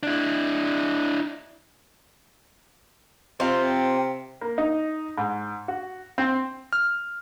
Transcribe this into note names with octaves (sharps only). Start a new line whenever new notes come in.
D4 E4
C3 C4 F4
A#3
D#4
G#2
F#4
C4
F6